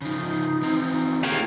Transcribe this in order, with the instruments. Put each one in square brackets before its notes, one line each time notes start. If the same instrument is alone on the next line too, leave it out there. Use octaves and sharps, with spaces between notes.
[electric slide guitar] C#3 F3 [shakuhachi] D#4
[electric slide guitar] E3 C4 A#5
[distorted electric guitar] D#3 A#3 [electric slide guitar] F4 G#4 A4